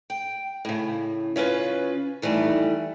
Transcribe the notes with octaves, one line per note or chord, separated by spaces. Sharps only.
G5
A2 C#3
C#3 C#4 F4 B4
D#3 E3 G3 A3